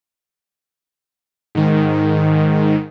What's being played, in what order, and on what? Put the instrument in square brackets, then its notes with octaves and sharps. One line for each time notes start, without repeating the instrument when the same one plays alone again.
[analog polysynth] G#2 D#3